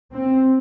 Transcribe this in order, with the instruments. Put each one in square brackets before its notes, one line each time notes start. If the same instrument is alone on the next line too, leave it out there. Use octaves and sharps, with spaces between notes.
[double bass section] C4